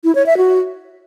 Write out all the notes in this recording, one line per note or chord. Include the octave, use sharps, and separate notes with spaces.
E4
C#5
E5
F#4